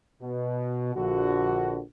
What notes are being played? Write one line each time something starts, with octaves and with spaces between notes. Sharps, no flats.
B2
A#1 D3 F#4